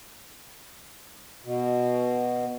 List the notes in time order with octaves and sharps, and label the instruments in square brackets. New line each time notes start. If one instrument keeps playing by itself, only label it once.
[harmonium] B2